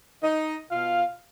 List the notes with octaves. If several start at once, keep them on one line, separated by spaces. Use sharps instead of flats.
D#4 D#5
B2 F4 F5